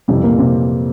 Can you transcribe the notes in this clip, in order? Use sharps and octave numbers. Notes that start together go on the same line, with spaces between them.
F2 C3 E3 G3
A#2 A#3
C3 C4